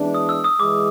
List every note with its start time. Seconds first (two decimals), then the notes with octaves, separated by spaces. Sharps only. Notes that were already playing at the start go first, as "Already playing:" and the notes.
Already playing: E3 G#3 B3 D4
0.15 D#6
0.29 E6
0.44 D#6
0.60 E3 G#3 D6